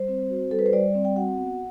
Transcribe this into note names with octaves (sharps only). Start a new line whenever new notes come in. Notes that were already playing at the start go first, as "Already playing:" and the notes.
Already playing: G3 C5
C4
F#4
G3 A4
B4
C5
G3 D5
C4
G5
F#4 F#5
B3